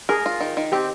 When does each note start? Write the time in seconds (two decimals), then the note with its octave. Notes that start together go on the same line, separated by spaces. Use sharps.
0.09 G#4 A#4
0.26 F4
0.40 D#3
0.57 D#3
0.72 C4 G4